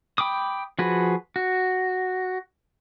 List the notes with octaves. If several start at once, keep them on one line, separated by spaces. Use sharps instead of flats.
G5 B5 D6 D#6
F3 F#4 G#4 B4
F#4